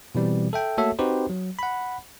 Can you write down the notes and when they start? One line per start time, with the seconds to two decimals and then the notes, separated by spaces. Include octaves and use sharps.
0.15 B2 E3 G3 C4
0.53 A4 E5 G5
0.77 A3 A#3 F#4 A4 C#5 E5
0.99 C4 D#4 F#4 G4 B4 C5
1.30 F#3
1.59 F#5 B5